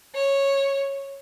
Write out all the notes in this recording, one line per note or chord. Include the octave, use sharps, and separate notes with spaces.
C#5